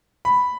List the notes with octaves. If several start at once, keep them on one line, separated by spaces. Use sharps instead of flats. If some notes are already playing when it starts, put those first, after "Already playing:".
B5